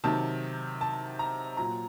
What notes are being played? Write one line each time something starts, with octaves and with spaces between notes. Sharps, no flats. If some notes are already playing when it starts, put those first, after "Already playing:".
C3 D#3 F#3 A5
A5
A#5
A#2 F#3 A#5